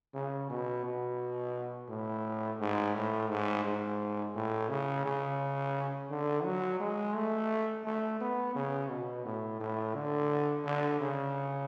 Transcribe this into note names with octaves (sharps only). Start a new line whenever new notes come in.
C#3
B2
B2
A2
G#2
A2
G#2
G#2
A2
C#3
C#3
D3
F#3
G#3
A3
A3
B3
C#3
B2
A2
A2
D3
D3
C#3